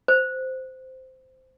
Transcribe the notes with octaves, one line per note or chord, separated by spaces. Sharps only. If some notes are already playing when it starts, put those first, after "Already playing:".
C5